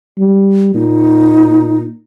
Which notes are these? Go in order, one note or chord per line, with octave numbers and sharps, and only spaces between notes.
G3
A#2 D#4